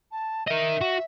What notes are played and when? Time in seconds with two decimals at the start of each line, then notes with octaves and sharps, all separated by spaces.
0.12 A5
0.48 A#4 D#5 E5
0.81 F#4